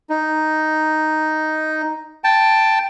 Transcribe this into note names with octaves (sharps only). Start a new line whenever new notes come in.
D#4
G5 A5